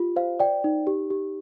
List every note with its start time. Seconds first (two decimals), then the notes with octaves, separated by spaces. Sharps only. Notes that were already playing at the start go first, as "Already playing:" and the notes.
Already playing: F4 G4
0.16 C5 F5
0.40 D5 G5
0.64 D#4
0.87 G4
1.10 G4